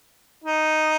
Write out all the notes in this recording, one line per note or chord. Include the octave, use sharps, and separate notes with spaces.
D#4